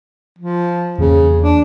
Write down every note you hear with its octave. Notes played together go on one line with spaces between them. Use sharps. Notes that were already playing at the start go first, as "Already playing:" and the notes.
F3
E2 C#3 A#3
D4